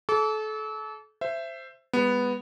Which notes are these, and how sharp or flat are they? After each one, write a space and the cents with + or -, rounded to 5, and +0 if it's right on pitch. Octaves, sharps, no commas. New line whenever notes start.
A4 -30 D6 -40
C5 +0 E5 +20
G#3 -40 B3 +0